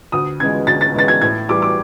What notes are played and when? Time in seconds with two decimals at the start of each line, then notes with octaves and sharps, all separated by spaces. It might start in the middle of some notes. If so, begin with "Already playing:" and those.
0.12 D2 D#6
0.40 C#3 E3 G#3 G#6
0.67 D2 A6
0.81 A6
0.94 C#3 E3 G#3 A6
1.08 G#6
1.21 A2 G#6
1.49 E3 G3 D6
1.62 D6